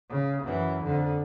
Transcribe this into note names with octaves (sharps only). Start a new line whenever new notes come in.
C#3
F#2 E3
F2 D3